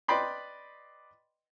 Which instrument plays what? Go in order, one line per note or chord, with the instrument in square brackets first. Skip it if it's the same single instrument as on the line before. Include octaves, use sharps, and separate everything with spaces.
[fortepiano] B4 D5 D#5 G5 B5 C6